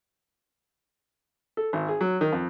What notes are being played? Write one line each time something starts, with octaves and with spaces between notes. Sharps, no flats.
A4
G#1
G#4
F#3
D#3
F2